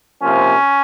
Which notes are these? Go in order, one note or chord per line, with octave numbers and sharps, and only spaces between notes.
C3 F3 A#3 C#4